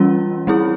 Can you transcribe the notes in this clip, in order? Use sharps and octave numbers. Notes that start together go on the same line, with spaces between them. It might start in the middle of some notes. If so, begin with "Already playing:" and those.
Already playing: E3 G3 C#4 F4
G3 C4 E4 G#4